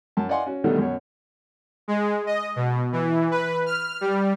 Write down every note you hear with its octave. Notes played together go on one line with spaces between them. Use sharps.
F#2 A5
D5 D#5 F5 F#5 G#5 C6
C#4 F#4
B2 D3 D#3 G3 A3 B3
F#2 B2 C#5
G#3
D#5
B2
E3
B4
F6
G3